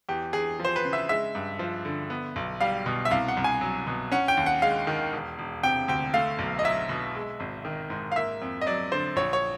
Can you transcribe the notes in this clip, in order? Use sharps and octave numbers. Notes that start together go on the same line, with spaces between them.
E2 G4
E2 G#4
F3
C5
B4
C#3
E5
G#3 E5
G2
F3
D3
B3
B1
G3 F5
B2
E5
C2 F5
F#5
C2
G#5
F#3
B2
C#4 F#5
G5
D#2
F#5
G#3 F5
D#3
E1
E1
C3 G5
D2 G5
A3 F5
B1
D#5
F#3 E5
B2
G#3
G#1
D#3
G#2
F5
A#3 E5
F2
D#5
F#3 D5
D3 C5
A#1 C#5
C#5